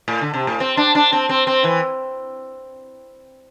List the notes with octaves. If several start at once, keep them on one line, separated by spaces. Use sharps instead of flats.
A2
D3
C3
A2
C4
D4
D4
C4
C4
C4
E3